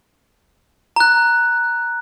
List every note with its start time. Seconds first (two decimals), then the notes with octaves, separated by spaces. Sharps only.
0.96 A#5 F#6